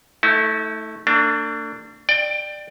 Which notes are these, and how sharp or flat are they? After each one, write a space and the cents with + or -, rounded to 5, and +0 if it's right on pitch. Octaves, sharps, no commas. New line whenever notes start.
A3 +0 E4 -45
A3 +45 D4 +0
D5 +20 G5 +0